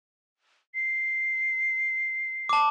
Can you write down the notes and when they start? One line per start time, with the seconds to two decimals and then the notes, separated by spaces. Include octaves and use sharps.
0.75 C7
2.49 A5 D6